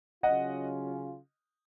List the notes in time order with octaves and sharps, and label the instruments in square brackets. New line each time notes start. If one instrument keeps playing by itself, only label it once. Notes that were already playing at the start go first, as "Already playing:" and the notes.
[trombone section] C#3 F#3 C#4 F4 [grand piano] D#5 F#5